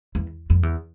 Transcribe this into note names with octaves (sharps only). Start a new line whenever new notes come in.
E2
F2
E2